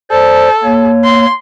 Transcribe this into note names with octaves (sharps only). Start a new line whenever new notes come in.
A4 C5 D5
A#3 C#5
C6